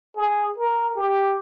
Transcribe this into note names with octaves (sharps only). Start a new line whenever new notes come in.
G#4
A#4
G4